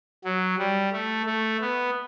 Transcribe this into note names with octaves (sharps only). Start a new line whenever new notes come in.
F#3
G3
A3
A3
B3